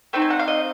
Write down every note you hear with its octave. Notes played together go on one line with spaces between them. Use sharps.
A3 C4 D#4 G5
G#5
F#5
F5
D#5